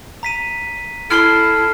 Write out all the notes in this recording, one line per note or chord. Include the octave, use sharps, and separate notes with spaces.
A#5 B6 D#7
E4 A4 F6 C7 G7